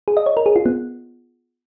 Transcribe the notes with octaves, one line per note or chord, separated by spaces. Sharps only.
G#4
D#5
C#5
A#4
G#4
F4
B3